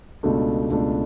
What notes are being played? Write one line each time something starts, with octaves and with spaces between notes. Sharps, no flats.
C#2 B2 A3 D4
C#2 B2 A3 D4